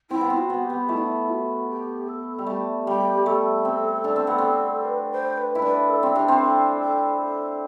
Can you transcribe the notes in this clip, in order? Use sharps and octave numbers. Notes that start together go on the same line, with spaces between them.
C4 E4
B3
C4
F#4
B3
G4
B3
A3 E4
D4
E4
F#4
G4
A4
G3
A3 G4
G3 G4
A3 A4
C4
D4
C4
B3
C4
B4
C5
B4
E4
D4 B4
A4
C4
D4 G4
C4
B4
A4
A4
A4